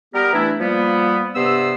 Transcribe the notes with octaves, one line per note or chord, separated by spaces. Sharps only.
G3 B3 G4 A#4
E3 A3 D4 E4
F3 G3 A#3 B3
G2 C3 B3 C5 E6